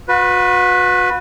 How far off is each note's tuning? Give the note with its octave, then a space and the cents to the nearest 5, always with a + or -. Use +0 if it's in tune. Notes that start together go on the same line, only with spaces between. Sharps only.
F#4 -40 B4 +0